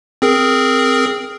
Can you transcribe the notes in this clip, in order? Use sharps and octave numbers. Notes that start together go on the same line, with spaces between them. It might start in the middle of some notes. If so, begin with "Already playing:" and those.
C4 G#4 A#4